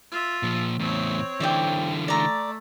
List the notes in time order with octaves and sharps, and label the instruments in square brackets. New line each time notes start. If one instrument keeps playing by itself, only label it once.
[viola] F4 E5
[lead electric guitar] A#2 F3
[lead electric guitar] E2 A2 [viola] C4 C#5
[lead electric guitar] D3 E3 [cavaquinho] C5 D5 G5
[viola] A3 [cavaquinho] D5 A#5